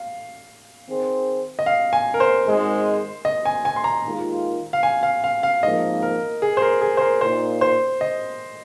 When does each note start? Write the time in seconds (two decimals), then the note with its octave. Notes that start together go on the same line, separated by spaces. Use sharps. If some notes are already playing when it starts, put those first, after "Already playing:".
Already playing: F5
0.88 D#3 C4 G#4 C5
1.59 D#5
1.66 F5
1.93 G#5
2.14 A#4
2.20 C5
2.46 G#1 G#2 D#3 G#3
3.25 D#5
3.45 G#5
3.65 G#5
3.76 C6
3.84 A#5
4.04 D#2 D#3 G#3 F4 A#4
4.73 F5
4.83 G#5
5.03 F5
5.24 F5
5.43 F5
5.62 G#1 G#2 F3 A#3 D#5
6.03 A#4
6.42 G#4
6.57 C5
6.62 A#4
6.81 G#4
6.97 C5
7.01 A#4
7.21 A#2 A#3 D#4 C5
7.61 C5
8.01 D#5